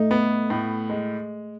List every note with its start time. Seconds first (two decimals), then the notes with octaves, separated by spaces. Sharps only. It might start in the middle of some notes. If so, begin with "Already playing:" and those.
Already playing: A3 D#4
0.11 B3
0.50 A2
0.90 G#3